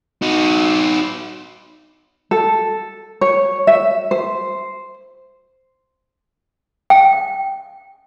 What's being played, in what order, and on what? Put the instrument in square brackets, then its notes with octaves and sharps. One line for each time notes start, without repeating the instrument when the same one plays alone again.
[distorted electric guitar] D#4 F#4
[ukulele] A4
C#5
E5
C5
[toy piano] G5